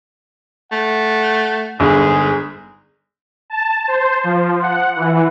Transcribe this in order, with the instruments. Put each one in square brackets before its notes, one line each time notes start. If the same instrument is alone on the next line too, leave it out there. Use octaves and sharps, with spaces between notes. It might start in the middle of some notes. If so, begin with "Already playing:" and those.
[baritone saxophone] A3 [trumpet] F#5
[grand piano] G1 [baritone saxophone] G#2 [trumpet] G#4
[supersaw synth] A5
C5
F3
F#5
E3